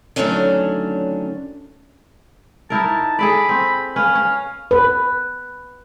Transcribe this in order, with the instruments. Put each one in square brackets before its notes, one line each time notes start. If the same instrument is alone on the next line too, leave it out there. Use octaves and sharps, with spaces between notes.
[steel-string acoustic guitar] D3 D#3 F#3 A3 C#4 D4
[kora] D#4 E4 A#4 [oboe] A5
[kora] G#4 A4 D5 [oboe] B5
[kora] C4
[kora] C#4 B4 [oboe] F5
[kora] C#4
[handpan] B4